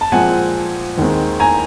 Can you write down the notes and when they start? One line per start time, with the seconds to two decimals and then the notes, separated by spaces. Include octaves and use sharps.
0.01 A5
0.12 A#2 F3 G#3 C4 F#5 G#5
0.98 D#2 D#3 G#3 C4
1.40 G#5 A#5